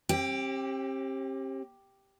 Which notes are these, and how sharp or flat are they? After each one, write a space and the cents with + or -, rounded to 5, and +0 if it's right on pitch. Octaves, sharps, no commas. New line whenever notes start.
C4 +40 G4 +0